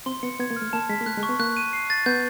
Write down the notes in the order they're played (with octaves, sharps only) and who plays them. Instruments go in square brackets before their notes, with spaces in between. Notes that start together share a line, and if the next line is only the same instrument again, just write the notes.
[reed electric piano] C4 [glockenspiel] C6
[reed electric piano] B3 [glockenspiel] C#7
[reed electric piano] B3 [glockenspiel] G#6
[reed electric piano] A#3
[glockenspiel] F6
[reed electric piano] A3
[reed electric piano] A#3 [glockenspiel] A5
[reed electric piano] G#3 [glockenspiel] B6
[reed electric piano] A#3
[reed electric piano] A3 [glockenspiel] F#6
[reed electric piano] G#3
[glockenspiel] C#6
[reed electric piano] B3
[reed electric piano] A#3 [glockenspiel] F#6
[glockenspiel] D#7
C7
A6
[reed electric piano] B3 [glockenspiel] G6